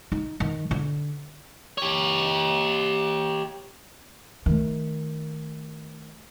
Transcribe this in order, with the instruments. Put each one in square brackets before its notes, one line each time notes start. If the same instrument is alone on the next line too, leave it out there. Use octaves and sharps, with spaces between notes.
[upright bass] D#4
D#3
D3
[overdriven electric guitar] G4 C#5
[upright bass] D#3 A3